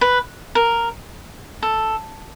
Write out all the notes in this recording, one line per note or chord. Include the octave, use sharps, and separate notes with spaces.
B4
A#4
A4